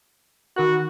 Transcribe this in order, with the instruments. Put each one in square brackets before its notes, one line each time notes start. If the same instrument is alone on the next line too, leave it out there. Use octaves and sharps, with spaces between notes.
[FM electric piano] D#3 A#4 F#6 [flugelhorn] F#4